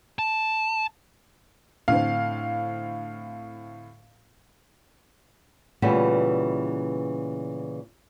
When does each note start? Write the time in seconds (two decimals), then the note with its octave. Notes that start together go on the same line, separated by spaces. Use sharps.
0.19 A5
1.88 A2 D3 C4 F5
5.82 A#2 C#3 E3 G3 A3 B3